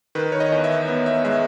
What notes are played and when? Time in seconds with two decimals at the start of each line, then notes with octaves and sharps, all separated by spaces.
0.15 D#3 B4
0.32 C#5
0.40 D#5
0.52 E2
0.64 E5
0.88 B3
1.06 E5
1.25 G#3 E5